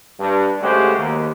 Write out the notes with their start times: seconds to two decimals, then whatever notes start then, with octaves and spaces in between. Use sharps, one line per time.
0.19 G2
0.62 C#3 G#3 A3 F#4 G4 C5
0.97 D#2